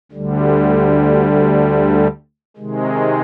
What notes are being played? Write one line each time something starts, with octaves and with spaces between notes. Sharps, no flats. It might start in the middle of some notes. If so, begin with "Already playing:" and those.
D2 D3 G3
C3 D#3 G#3